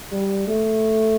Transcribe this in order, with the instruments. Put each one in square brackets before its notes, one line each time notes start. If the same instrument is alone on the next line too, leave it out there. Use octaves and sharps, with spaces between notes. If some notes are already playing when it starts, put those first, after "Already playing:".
[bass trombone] G3
A3